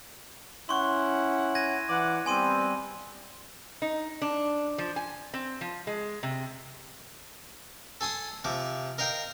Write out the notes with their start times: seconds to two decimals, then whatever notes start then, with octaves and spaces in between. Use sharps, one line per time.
0.69 C#4 E4 F#5 C6 C#6
1.55 G#6 A#6 D#7
1.88 E3 D5 F#5
2.26 G3 B3 C4 G#5 C6 D#7
3.82 D#4
4.22 D4
4.78 F3
4.96 G#5
5.34 C4
5.61 F3
5.87 G#3
6.23 C3
8.01 A4 G#5 C6 D#6
8.44 C3 F3 D6
8.98 A#4 D#5 F5 G5